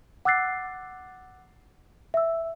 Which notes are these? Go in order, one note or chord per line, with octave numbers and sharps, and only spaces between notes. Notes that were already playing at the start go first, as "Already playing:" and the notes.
F#5 D6 E6 F#6 A6 C7
E5 E6